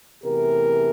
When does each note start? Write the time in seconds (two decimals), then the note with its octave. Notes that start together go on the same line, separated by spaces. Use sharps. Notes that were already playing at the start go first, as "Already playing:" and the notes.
0.23 E2 C3 E3 A3 G4 A#4